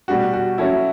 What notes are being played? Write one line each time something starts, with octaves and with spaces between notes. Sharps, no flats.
B2 G3 D4 F#4 G4
F#4
F#3 C#4 E4 F#4 A4 C#5